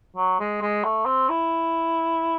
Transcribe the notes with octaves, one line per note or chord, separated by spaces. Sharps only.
F#3
G#3
G#3
A3
C4
E4